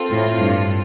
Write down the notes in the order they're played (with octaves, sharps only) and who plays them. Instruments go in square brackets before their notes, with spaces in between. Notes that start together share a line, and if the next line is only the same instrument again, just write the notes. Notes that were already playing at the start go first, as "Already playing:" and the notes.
Already playing: [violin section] C4 F4 A4
[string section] A2
G2